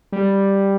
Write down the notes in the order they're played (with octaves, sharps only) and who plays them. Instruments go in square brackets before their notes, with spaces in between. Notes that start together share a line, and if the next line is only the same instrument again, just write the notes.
[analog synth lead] G3